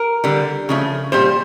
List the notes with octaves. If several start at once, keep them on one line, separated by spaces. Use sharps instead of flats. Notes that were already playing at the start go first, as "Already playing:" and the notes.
Already playing: A#4
D3 G3
C#3 F3 A3
A#2 G3 C5